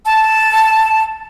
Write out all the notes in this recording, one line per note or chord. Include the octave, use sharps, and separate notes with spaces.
A5